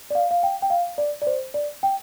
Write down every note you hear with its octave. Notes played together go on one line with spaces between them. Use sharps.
D5
F5
F5
G5
G5
F5
D5
D5
C5
D5
G5